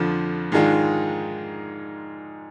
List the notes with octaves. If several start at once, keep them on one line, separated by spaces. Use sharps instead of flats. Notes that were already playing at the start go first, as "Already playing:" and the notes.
Already playing: F2 D3 F3
G#2 D#3 G#3 D4 F4